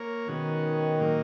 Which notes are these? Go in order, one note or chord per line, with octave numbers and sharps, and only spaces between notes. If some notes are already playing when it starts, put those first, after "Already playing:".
Already playing: A#3 A#4 C#5
B2 D#3 G#3 C#4 F#4
A#2 F#3 A#3 D#4